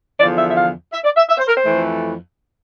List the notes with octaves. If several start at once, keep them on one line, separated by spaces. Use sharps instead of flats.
E2 D3 F3 D5
E5
E5
F5
E5
D5
E5
E5
C5
A#4
C5
F2 E3 A3